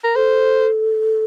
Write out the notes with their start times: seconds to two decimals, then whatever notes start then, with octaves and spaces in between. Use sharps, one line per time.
0.04 A#4
0.15 A4 C5